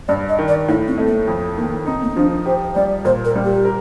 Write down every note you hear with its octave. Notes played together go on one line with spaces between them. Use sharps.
G2 D5
D#5
D#3
D5
A2 D#4
C4
A3
A#3
F2
D#3 A#3
C4 D#4
A#3
C4
F3 D4
G4 C5
G3 D5
A#2 C5
A#4
G3
G4
A#4